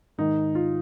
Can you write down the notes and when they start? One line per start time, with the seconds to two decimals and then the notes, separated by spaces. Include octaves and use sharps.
0.18 G#2 D#3 D#4
0.55 F4